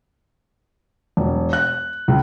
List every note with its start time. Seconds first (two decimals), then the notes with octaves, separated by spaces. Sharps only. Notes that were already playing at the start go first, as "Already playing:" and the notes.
1.17 E1
1.53 F#6
2.08 C#2